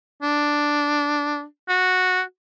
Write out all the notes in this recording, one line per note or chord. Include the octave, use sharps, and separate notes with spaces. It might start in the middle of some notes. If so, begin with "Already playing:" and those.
D4
F#4